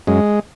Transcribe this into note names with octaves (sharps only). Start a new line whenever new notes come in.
F#2 G#3